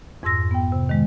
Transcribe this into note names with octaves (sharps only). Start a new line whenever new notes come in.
F2 G#2 C6 E6 A#6
B3 G5
C3
D#3 G#3